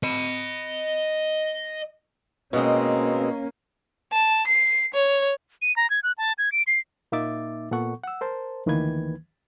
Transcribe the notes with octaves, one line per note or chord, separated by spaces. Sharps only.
D#5 B5
B2 G#3 A#3 C4 C#4
A5
C7
C#5
D#7
A#5
G#6
F#6
A5
G#6
D7
C7
A#2 A#3 D#4 E5 D6 A6
A#2 B3 A4 F#5 C#6
F#5 E6
A#4 C5 A5
D2 D#3 E3 A#3 B4 G#6